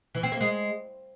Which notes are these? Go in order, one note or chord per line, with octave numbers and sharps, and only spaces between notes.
E3
C4
A#3
G#3